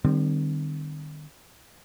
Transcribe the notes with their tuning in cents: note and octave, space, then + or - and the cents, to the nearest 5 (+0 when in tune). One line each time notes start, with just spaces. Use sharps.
D#3 -45 G3 +0 C4 -10